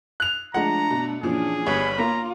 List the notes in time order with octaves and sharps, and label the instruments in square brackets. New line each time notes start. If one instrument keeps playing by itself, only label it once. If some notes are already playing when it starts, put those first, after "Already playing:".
[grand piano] F#6 F7
[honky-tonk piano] F3 G#3 [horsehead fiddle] A3 D4 [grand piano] F#5 [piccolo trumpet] A#5
[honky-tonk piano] B2
[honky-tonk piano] A#2 E3 F3 [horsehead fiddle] C#4 D4 [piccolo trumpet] G#4
[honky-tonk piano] G1 G2 [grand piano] C#5 [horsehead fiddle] B5
[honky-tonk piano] A#3 [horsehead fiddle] F4 [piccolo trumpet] A#5